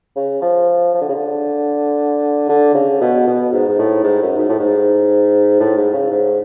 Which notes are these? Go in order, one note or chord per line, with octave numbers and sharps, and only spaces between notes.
C#3
F3
F3
D3
C#3
D3
D3
C#3
B2
B2
G#2
G#2
A2
G#2
F#2
G#2
A2
G#2
A2
G#2
C#3
G#2